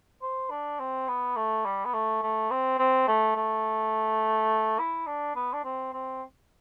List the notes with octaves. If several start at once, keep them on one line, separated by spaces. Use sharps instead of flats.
C5
D4
C4
B3
A3
G3
B3
A3
A3
C4
C4
A3
A3
E4
D4
B3
D4
C4
C4